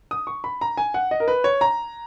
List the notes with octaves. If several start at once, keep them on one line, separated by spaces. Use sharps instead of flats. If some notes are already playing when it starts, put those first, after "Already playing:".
D#6
C#6
B5
A#5
G#5
F#5
D#5
A#4
B4
C#5
A#5